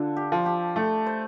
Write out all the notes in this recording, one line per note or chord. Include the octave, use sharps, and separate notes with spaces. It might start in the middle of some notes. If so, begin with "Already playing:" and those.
Already playing: D3 D4 F4 A4
G4
F3
G4
A3 A4
C5